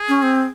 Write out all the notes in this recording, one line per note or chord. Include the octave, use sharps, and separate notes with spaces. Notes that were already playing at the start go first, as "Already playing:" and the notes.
Already playing: G#4
C#4
C4